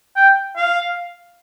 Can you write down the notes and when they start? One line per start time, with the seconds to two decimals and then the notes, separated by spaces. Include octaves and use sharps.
0.16 G5
0.56 F5